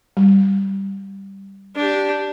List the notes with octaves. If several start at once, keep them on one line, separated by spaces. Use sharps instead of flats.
G3
D4 G4